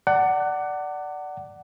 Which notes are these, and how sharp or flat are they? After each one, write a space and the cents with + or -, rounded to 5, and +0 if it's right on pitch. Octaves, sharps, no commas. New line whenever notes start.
D5 +0 F#5 +20 A5 +45